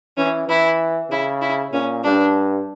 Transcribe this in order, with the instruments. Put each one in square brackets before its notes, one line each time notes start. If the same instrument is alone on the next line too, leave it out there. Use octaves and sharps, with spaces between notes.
[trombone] E3 [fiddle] C#4
[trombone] E3 [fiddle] E4
[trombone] C#3 [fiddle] E4
[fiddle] E4
[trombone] A#2 [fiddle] C#4
[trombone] G2 [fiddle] D4